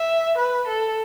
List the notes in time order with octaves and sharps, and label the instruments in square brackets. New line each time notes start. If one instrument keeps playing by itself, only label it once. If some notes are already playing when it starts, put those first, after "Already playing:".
Already playing: [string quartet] E5
B4
A4